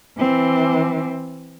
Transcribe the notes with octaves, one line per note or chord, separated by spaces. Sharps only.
E3 C4